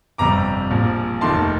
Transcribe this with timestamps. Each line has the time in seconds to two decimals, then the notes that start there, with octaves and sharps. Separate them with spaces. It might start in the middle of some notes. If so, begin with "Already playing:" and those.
0.18 G1 F2 C3 G3 A#5 D6
0.70 A#1 A#2 F3
1.21 F1 D#2 D#3 A3 A5 C6